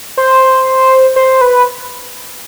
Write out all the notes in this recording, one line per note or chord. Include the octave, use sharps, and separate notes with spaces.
C5
C5
B4